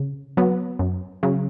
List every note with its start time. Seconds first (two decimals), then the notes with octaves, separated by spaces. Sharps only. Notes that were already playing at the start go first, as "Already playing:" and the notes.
Already playing: C#3
0.37 F#3 B3
0.79 F#2
1.23 C#3 F#3